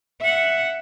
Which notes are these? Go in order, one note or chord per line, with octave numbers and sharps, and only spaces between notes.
E5 F#5